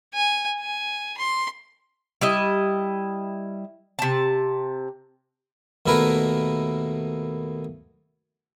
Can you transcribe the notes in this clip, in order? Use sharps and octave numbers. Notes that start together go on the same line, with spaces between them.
G#5
G#5
C6
G3 E4 D#5
C3 A5
D#2 B2 A3 E4 A#4 B4